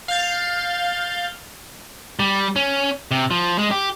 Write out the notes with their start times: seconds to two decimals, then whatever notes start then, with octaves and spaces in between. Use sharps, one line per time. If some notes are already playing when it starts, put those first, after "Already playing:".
0.08 F5 F6 G6 A6
2.19 G3
2.56 C#4
3.11 C3
3.31 F3
3.59 G#3
3.71 G4